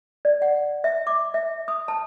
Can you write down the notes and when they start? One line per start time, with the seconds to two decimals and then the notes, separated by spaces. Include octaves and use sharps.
0.25 D5
0.42 F#5
0.84 E5
1.07 D6
1.34 E5
1.68 D#6
1.88 A5